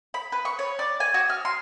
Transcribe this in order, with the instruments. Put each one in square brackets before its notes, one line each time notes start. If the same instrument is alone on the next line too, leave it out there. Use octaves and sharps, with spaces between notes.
[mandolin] B5
B4
C#6
C#5
D5
G#5
F#4
F6
C6